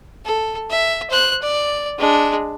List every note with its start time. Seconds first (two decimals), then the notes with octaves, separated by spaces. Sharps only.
0.25 A4
0.70 E5
1.10 C5 F#6
1.42 D5
1.99 G#3 D4